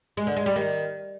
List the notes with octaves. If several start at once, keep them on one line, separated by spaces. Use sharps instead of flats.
G#3
D3
G#3
G3
D#3